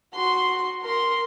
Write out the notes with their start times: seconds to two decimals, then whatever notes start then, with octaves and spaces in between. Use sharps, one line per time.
0.14 F#4 C6
0.84 A#4 C6